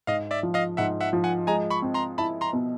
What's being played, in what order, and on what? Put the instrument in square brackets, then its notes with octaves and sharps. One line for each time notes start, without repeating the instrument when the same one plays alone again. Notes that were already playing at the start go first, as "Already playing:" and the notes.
[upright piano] G#2 [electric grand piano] D#5 F5
[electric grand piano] D5 E5
[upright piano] F3
[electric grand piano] D#5 F5
[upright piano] G#2 [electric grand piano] E5 F#5
[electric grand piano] E5 F#5
[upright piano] F3
[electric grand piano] F#5 G#5
[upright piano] G#3 [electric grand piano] G#5 A#5
[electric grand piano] B5 C#6
[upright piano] C4
[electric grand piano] A#5 C6
[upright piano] E4 [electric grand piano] A5 B5
[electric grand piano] A#5 C6
[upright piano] B2